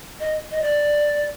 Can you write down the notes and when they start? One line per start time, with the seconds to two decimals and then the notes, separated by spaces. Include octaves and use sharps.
0.20 D#5
0.51 D#5
0.62 D5